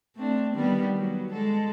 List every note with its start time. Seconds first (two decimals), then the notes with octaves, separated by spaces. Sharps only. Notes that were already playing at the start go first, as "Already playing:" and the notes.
0.16 A3 C4 D4
0.55 D#3 G3 B3
0.98 F#3 B3
1.33 G#3 A4